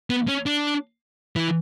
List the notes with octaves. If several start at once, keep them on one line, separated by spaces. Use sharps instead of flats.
B3
C#4
D4
E3